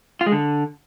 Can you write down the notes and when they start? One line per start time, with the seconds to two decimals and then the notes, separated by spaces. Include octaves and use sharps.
0.21 F4
0.26 G#3
0.32 D3